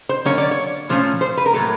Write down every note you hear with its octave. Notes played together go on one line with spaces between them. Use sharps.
C5
D3 F#3 A#3 C#4 C#5
D5
C#5
A#2 F3 A3 C#4 C5
C5
B4
A#4
A2 F#3 A#3 A4